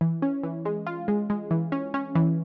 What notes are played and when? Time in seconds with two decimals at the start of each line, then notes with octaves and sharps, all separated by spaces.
0.01 E3
0.22 C#4
0.44 E3
0.65 G#3
0.87 F4
1.08 G#3
1.30 G#3
1.51 E3
1.72 C#4
1.94 C#4
2.15 E3